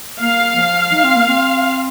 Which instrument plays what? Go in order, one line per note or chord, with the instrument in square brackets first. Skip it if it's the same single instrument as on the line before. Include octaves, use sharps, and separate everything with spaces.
[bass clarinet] A#3 [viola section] F5
[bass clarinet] F3
D#4
C4
A#3
C4